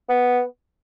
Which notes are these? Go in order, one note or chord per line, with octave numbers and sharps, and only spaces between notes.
B3